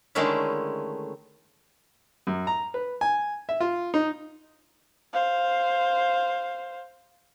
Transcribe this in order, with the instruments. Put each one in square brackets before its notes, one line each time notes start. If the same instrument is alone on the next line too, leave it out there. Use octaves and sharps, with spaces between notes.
[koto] D3 D#3 G#3 A3 C#4 E4
[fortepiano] F#2
A#5
B4
G#5
E5
F4
D#4
[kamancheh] C5 F5